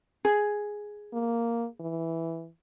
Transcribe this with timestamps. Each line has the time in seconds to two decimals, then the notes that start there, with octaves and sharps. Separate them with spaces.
0.25 G#4
1.13 A#3
1.80 E3